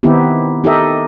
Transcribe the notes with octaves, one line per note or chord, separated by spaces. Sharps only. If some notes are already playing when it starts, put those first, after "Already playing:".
D#3 B3 C4 D#4 E4 G4
D#4 G4 A4 A#4 D#5 E5